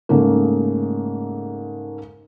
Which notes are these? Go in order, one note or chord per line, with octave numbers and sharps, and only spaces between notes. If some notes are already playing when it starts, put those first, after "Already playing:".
G#2 C#3 A3 A#3